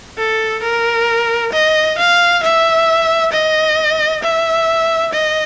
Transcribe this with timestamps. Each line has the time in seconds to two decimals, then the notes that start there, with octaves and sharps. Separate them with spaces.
0.18 A4
0.63 A#4
1.53 D#5
1.98 F5
2.43 E5
3.32 D#5
4.23 E5
5.13 D#5